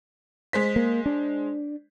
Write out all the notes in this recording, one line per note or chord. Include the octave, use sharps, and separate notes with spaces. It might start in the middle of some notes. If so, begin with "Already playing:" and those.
G#3 C5 B6
A#3
D4